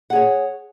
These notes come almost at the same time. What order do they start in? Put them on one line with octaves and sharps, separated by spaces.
F#5 G#4 C#5